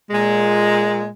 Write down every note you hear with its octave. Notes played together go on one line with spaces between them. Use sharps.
A#2 G#3